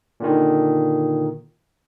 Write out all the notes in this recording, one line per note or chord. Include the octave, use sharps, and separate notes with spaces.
A#2 D3 D#3